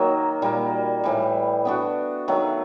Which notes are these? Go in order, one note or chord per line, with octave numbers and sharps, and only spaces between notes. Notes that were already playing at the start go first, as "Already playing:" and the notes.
Already playing: D#3 F#3 A#3 D#4
A#2 G3 A#3
A2 E3 G3
B3 D4 F#4
D#3 F#3 A3